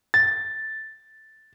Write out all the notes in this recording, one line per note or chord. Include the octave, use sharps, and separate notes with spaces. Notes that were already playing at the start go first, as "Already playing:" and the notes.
A6